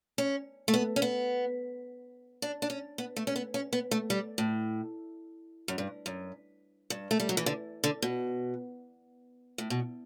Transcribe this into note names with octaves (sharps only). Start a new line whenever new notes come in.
C#4
A3
B3
C#4
B3
D4
D4
C#4
B3
A3
C#4
B3
C#4
B3
A3
G3
A2
F#2
G2
F#2
G2
A3
G3
F#3
E3
D3
D3
B2
A2
B2